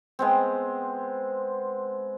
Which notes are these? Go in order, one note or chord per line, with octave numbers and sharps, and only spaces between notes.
G#3 B3 C4